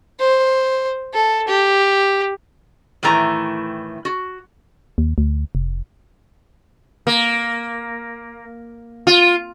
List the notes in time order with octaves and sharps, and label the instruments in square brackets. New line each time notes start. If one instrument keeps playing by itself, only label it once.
[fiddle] C5
A4
G4
[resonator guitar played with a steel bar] A2 D#3 E3 A3 A#5
F#4
[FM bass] D#2
D2
F1
[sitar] A#3
F4